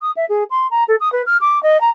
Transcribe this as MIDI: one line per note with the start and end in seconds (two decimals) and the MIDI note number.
0.02 0.11 87
0.16 0.25 76
0.29 0.44 68
0.50 0.67 84
0.71 0.84 82
0.88 0.96 69
1.00 1.11 87
1.12 1.22 71
1.26 1.37 89
1.41 1.61 86
1.63 1.80 75
1.81 1.89 82